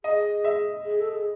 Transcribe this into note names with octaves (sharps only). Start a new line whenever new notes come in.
G#4 D#5
E5
G#4
A4
G#4